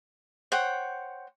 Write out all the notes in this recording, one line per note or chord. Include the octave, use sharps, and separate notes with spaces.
C5 C#5 F#5 G5